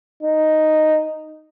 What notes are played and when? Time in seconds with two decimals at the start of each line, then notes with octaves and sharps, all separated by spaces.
0.23 D#4